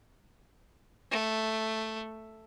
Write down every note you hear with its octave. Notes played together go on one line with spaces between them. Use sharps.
A3